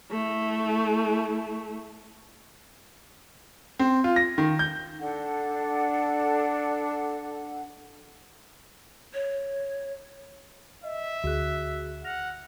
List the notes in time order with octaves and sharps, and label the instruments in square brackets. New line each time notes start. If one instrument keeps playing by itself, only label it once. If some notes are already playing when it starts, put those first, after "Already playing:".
[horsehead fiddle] A3 E4
[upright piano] C4
F4
A#6
D#3
G6
[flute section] D4 A4 F#5
[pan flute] C#5
[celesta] D#5 [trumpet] E5
[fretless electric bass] D2 [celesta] F#4 G#4 F#6
[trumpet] F#5 [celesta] F6 A#6 F7